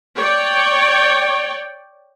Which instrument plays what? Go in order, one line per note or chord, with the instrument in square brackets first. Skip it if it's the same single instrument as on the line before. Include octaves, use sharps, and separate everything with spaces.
[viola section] C#5 D5 G5